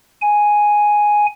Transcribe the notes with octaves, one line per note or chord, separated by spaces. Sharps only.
G#5